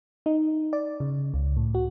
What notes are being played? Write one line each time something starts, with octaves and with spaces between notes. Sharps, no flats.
D#4
D5
C#3
C#2
A2
F#4